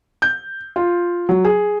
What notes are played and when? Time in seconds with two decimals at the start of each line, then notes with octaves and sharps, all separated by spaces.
0.22 G6
0.76 F4
1.29 F#3
1.45 G#4